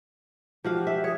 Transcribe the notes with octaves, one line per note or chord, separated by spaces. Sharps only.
F3 F#4 G4 F5
E5
G#4 C#5